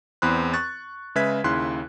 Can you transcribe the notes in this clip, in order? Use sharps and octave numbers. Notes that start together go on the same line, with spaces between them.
E2 C4 B5 C6 F#6
C#6 F#6 A6
C#3 G#3 B4 E5 G#6 B6
D#2 C#3 E4 C6 F#6